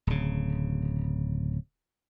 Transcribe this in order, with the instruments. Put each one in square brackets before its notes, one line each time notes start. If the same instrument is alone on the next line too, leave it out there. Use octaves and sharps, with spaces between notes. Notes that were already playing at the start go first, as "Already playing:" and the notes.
[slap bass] D1 C#3